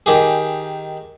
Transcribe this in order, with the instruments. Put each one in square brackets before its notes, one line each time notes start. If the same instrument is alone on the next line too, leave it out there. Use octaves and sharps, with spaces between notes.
[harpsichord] D#3 G4 G#4